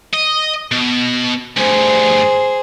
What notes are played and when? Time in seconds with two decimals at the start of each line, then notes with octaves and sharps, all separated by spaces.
0.13 D#5
0.71 B2
1.57 D2 G2 G#4 C5